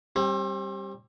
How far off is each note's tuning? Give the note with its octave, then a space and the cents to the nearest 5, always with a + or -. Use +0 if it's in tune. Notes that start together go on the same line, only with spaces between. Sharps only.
G3 +0 C4 +40